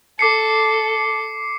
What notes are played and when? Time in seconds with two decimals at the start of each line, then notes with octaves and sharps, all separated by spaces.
0.19 A4 D6 C7 C#7